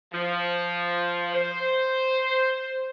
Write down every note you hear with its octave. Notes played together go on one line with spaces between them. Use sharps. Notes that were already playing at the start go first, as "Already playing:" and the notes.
F3
C5